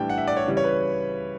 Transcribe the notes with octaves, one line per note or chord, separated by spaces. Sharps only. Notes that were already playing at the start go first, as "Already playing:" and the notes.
Already playing: A2 E3 G3 D4 G5
F#5
E5
D5
C#5
C#3 E3 G3
C#5
B4